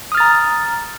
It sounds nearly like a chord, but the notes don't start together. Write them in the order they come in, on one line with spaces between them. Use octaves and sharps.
D#6 F6 A6 A#5